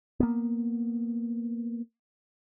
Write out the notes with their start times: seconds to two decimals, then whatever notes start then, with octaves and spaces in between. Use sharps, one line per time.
0.20 A#3 B3